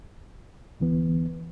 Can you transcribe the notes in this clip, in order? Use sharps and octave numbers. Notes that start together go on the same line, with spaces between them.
D2 E3 B3